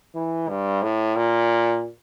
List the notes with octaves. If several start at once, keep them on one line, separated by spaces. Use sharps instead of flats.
E3
G2
A2
A#2